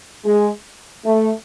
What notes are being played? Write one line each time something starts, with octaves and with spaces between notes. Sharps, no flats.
G#3
A3